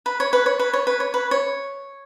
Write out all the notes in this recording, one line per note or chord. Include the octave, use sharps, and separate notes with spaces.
B4
C#5
B4
C#5
B4
C#5
B4
C#5
B4
C#5